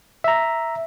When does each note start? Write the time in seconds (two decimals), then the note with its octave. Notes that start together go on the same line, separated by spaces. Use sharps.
0.24 E5 A#5